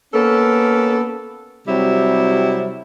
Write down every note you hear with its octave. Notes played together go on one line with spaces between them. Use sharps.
A#3 B3 C#4 A4
C3 F#3 G3 C4 E4